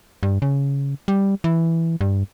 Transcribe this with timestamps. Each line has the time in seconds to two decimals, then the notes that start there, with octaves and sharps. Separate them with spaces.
0.23 G2
0.42 C#3
1.08 G3
1.44 E3
2.01 G2